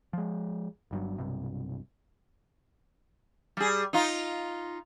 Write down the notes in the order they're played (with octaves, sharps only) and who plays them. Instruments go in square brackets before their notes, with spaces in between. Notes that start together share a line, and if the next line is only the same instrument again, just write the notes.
[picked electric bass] F3 G#3
G1 G2 F#3
B1 G2 C3
[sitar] G3 G#4
D#4 F4